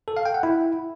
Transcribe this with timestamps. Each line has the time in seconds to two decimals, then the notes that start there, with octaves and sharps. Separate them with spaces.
0.08 A4
0.17 F5
0.25 G5
0.34 F#5
0.43 E4